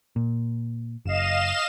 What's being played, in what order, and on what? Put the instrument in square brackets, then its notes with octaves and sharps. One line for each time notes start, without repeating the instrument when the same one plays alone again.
[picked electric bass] A#2
[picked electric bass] F#1 [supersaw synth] D#5 F5 E7